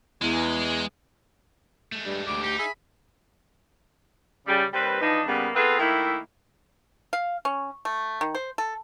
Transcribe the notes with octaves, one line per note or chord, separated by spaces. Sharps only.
E2 G#3
G#3 A3
G2 G3
D2 G3 D6
D#4 G4
G#4 E5 B5
C#3 G3
D#2 G3 C4 B4
E3 F3 D4 D#4
C#3 G3 A#3 B3
B3 C4 F4 G#4 A4 B4
D#3 A3 A#3 E4
F5
C#4
A3
D#3
C5
A4